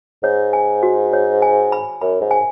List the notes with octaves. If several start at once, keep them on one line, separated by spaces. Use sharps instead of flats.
G#2 C#5
G#5
F#4
C#5
G#5
B5
F#2 B5
G#2
G#5